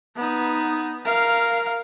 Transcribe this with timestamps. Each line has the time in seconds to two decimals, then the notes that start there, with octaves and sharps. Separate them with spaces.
0.16 B3 D#4
1.05 A#4 F5